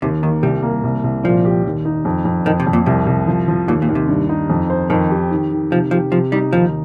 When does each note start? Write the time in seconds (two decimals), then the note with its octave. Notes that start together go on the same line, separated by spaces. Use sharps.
0.02 D#2 C3
0.22 D#3 A#3
0.43 C2 G3
0.63 A#3
0.84 C2
1.04 C2
1.24 A#2 F3
1.45 G4
1.65 D#2
1.85 D#4
2.05 F2
2.25 F2
2.46 F2 D#3
2.60 C3
2.67 F2
2.73 A#2
2.86 C2 C3
3.07 C2
3.28 F3
3.48 F3
3.68 D#2 A#2
3.82 A#2
3.89 D#2
3.95 C3
4.08 G2
4.29 D#4
4.50 F2
4.70 C5
4.90 F2 D#3
5.10 G4
5.31 D#3
5.51 D#3
5.71 C3 F3
5.91 F3 G4
6.12 C3 F3
6.32 G3 D#4
6.53 D#2 F3